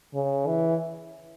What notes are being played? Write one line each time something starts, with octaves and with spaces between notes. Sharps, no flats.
C#3
E3